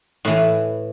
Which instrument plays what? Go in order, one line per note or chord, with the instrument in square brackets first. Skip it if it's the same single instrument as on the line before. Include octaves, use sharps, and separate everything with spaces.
[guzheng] A2 E3 B4